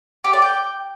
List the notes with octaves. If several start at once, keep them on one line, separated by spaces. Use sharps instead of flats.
G4
D5
G5